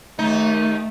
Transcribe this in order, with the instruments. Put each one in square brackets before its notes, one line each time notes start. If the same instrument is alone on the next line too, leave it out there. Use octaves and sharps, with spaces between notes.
[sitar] D#2 D#4 [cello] A3